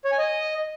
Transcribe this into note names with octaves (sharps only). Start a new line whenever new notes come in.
C#5
G#5
D#5